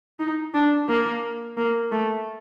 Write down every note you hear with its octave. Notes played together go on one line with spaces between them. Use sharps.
D#4
D4
A#3
A#3
A3